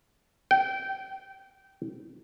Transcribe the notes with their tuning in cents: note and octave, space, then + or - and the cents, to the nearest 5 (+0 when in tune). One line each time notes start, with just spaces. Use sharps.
G5 -20